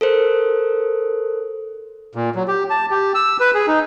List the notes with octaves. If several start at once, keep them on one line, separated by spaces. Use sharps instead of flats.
A4 A#4 C5
A#2
F#3
G4
A5
G4
E6
B4
G#4
D#4